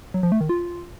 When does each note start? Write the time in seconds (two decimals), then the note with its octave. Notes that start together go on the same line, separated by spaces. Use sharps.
0.14 F#3
0.23 F3
0.32 A3
0.41 D#3
0.49 F4